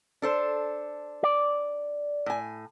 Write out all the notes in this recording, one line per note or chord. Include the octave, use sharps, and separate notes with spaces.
D4 A4 C5
D5
A2 G#5